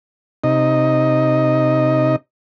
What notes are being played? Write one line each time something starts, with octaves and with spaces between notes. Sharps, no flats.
C3 D#4 D#5